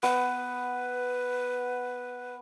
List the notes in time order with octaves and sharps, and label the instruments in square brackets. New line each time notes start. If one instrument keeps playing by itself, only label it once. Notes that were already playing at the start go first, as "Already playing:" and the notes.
[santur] B3 F#5 [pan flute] B4